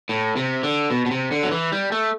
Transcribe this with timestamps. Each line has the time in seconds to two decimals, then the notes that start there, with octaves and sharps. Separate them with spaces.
0.09 A2
0.36 C3
0.63 D3
0.90 B2
1.06 B2
1.11 C3
1.31 D3
1.43 F#3
1.51 E3
1.72 G3
1.92 A3